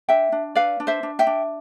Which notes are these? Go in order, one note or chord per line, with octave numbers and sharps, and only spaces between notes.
D4 E5 G5
D4
B4 D5 F5
D4
C5 E5
D4
E5 G5
D4